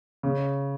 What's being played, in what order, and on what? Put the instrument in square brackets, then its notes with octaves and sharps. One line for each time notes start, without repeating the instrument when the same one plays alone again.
[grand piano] C#3